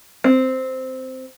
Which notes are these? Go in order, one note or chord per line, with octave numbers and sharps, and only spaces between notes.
C4